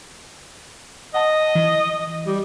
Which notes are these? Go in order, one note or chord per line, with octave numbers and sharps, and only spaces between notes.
D#5 F#5 A5 D#6
E3
G3